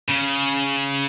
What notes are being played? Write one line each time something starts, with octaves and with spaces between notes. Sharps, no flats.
C#3